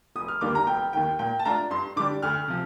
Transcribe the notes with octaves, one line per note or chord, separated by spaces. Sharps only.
F1 D#6
F6
D#2 D3 G3 A#3 D6
A#5
F1 G5
D#2 D#3 G5
A#2 G5
A5
A3 D4 F4 A#5
G2 C6
D3 G3 D4 D6
D2 F6
C3 F3